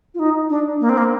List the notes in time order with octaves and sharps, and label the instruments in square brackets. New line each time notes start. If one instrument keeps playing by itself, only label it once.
[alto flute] F4
D#4
D4
A#3
C4
A#3